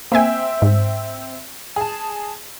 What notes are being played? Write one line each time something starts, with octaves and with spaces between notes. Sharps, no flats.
A#3 C4 E5 G5 G#5
G#2
G#4 A5